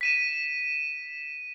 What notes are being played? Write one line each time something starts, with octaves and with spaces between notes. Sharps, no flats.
B6 D#7 E7